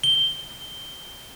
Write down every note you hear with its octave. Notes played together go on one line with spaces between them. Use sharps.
G7